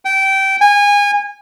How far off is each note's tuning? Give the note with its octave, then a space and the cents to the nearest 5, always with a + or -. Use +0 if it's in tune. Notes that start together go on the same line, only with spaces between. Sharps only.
G5 -20
G#5 -25